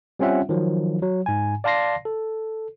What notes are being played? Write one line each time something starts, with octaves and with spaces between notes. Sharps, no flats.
G3 C4 C#4 F4 E5 F#5
D#3 F3 F#3
F#3
G#2 G#5
D5 F5 A5 C6 A#6 C7
A4